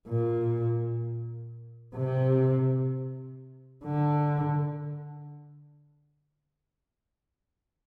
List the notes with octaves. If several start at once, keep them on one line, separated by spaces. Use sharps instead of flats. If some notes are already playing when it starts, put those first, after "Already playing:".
A#2
C3
D3